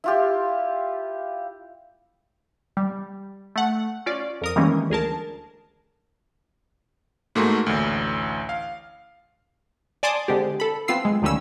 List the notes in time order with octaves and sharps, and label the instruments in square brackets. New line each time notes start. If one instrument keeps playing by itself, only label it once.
[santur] E4 F4 G4
[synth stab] G3
A3 F#5
C#4 F4 D5
F2 A#4 D#6
D#3 E3 G3 G#3 A#3 C#4
D2 G#4 A#4 A5
[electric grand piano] G#2 A3 A#3 F#4 G#4 C6
A1 D2
F5
[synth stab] D5 G#5 A5 C6 D6 D#6
D3 G#3 C4 G4
A4 B5
B3 C4 F4 E6 C7
G#3
D2 D#3 F3 G3 C#4 E6